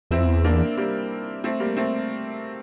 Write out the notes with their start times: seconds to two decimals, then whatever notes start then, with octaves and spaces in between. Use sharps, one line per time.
0.11 E2 C4 E4
0.18 F2
0.26 E2
0.44 A#3 D4
0.77 G3 A#3
1.44 A3 C4
1.60 G3 A#3
1.76 A3 C4